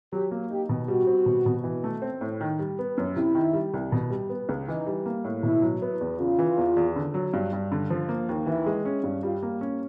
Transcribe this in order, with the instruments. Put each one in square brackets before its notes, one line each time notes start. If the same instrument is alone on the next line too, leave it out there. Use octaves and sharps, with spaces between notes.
[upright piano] F#3 [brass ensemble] G4
[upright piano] A#3
[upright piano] D#4 [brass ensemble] G4
[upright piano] B2
[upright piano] G3 [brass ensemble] F#4
[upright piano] C4
B2
B2
E3
A3
C4
A2
D#3
G3
B3
F#2
[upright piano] C3 [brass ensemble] E4
[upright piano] D#3
G3
C2
B2
G3
B3
C#2
[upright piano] E3 [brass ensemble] D#4
[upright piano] G3
A#3
A2
[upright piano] B2 [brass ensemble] E4
[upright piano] F#3
B3
E2
[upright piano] C#3 [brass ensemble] F4
[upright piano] E3
E2
E2
D3
F#3
G2
G2
D3
F3
A#3
D#2
[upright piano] E3 [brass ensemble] E4
[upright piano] G#3
C#4
G2
[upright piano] G3 [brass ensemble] F4
[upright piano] A#3
C#4